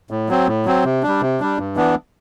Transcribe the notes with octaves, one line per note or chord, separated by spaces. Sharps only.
A2
F#3 C4
A2
F#3 C4
C3
G3 D4
C3
G3 D4
G2
E3 B3 D4